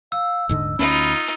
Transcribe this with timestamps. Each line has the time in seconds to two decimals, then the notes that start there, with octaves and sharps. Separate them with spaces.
0.12 F5 E6
0.49 D#1 G#2 D3 D#5
0.79 D2 C#4 D#4 F4 B5